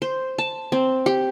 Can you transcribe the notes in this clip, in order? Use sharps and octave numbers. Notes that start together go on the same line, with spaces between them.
C5
A5
C4
G4